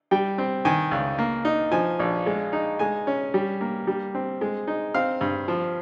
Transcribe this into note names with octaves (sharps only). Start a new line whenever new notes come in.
G3 G5
C4
D#3 G#5
C#2
A#3
D#4
F3 G#5
A#1
G#3
D#4
G#3 G#5
C#4
G3
A#3
G3
C4
G#3
D#4
C4 F5
G2
F3